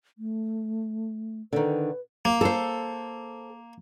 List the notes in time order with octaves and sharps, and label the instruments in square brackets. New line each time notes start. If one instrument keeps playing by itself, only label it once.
[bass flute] A3
[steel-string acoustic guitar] D3 D#3 [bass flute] B4
[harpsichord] A#3
[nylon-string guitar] A4 C5